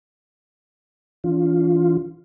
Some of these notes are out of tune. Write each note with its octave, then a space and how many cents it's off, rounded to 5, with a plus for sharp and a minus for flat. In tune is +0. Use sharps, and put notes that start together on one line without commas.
E3 +0 D4 -45 F4 +0